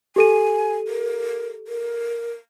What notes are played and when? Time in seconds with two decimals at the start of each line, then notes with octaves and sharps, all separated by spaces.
0.16 G4 A4 G#5 D#7
0.88 A#4
1.68 A#4